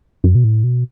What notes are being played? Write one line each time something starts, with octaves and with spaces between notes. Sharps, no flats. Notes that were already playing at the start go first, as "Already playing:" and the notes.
F#2
B2
A2
B2